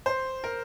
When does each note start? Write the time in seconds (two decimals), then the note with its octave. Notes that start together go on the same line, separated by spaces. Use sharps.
0.06 C5
0.44 A#4